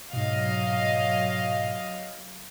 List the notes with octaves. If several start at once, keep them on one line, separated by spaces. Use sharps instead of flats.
G#2 B2 F#3 D#5 F5